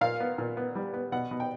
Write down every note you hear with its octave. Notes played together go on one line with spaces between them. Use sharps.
A#2 F5
B3
A#2
B3
G3
B3
B2 F#5
B2
G5